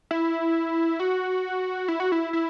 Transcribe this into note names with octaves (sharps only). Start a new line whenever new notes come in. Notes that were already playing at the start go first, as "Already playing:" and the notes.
E4
F#4
E4
F#4
E4
E4